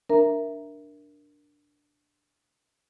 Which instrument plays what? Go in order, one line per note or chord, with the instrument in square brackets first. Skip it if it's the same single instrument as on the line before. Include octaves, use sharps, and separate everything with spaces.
[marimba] D4 A#4 E5 A#5